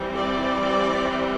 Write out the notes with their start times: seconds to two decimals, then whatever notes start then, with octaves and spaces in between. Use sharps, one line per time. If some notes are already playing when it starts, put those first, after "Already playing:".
Already playing: E3 G3 C4
0.16 D5